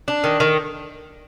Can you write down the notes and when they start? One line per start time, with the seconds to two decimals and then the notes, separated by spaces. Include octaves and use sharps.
0.08 D4
0.24 D#3
0.40 D#3